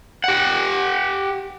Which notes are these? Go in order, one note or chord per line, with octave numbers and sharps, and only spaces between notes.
G4 F#5